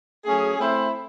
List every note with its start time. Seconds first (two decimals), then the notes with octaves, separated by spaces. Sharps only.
0.25 F#3 A3 C#4 G#4
0.58 A3 C4 E4 C5